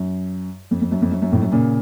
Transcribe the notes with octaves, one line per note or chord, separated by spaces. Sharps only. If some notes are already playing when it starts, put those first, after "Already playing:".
Already playing: F#2
F2
F2
F#2
F2
F#2
F#2
F2 A2
F#2
A#2 C#3